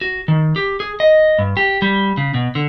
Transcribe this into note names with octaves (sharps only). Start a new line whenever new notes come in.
F#4
D#3
G4
G#4
D#5
G2
G4
G3
C#3
B2
D3